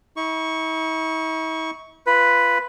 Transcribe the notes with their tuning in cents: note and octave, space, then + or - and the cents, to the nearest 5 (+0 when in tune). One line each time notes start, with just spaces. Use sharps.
E4 -45 C#6 +0
F4 -20 B4 +0